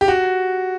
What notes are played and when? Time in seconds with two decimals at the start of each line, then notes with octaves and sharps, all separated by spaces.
0.01 G4
0.08 F#4